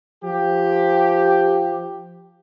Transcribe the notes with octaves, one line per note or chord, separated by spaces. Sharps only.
F3 G4